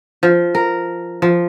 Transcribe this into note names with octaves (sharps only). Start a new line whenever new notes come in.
F3
A#4
F3